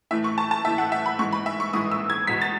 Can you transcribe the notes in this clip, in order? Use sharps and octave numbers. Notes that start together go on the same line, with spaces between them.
A2 E3 A3 E5
C#6
A5
A5
A2 E3 A3 E5
F#5
E5
B5
G#2 E3 G#3 C#6
B5
E5
C#6
G#2 E3 G#3 D#6
E6
G#6
E2 B2 G#3 B6
A6